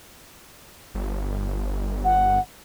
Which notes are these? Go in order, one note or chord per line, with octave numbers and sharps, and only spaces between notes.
G1
F#5